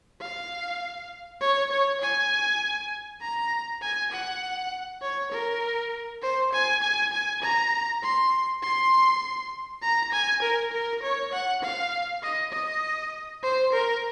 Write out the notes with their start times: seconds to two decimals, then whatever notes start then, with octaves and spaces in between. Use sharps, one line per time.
0.21 F5
1.41 C#5
1.71 C#5
2.01 G#5
3.21 A#5
3.82 G#5
4.12 F#5
5.02 C#5
5.32 A#4
6.22 C5
6.52 G#5
6.82 G#5
7.12 G#5
7.42 A#5
8.03 C6
8.62 C6
9.82 A#5
10.12 G#5
10.42 A#4
10.72 A#4
11.03 C#5
11.32 F#5
11.63 F5
12.22 D#5
12.52 D#5
13.43 C5
13.72 A#4